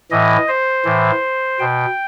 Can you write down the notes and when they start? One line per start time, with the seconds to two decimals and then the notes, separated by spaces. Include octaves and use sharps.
0.11 A2 E3 D#5
0.48 C5
0.85 A2 E3
1.59 B2 G5